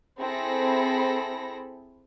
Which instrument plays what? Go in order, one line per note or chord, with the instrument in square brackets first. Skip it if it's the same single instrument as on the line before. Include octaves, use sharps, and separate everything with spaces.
[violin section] C4 E4 G#4 A4 B5 A#6